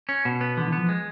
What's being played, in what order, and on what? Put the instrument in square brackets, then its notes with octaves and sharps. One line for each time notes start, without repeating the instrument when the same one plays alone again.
[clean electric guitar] C#4
B2
B3
[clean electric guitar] D3 [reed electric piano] E3
[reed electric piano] E3
[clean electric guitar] B3
[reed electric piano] F3
[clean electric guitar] G#3